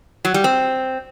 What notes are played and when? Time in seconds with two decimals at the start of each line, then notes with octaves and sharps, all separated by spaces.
0.25 F#3
0.34 G3
0.44 C4